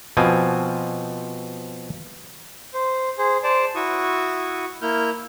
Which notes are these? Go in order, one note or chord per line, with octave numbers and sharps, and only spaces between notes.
B2 F3 C4 G#5
C5
G#4 C5
C5 D5 A5
E4 F#4 C#6 D#6
A#3 E4 F6 G6